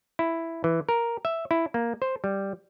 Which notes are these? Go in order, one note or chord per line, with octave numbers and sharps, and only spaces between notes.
E4
E3
A#4
E5
E4
A#3
C5
G3